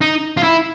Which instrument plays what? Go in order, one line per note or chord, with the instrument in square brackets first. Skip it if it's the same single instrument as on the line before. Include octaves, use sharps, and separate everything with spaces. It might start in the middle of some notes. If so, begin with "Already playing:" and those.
[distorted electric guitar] D#4
F4
E4